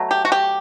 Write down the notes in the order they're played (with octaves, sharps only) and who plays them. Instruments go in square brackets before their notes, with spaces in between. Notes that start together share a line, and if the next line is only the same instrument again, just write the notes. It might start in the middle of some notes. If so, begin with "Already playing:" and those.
Already playing: [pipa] B2 F#3 A3
G4
F#4
G4